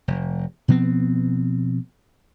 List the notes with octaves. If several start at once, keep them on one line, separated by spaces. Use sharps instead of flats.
F1
B2 F3 B3 C4